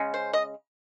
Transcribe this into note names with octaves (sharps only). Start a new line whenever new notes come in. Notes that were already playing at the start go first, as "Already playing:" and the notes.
Already playing: C#3 G#3 C#4
C5
D#5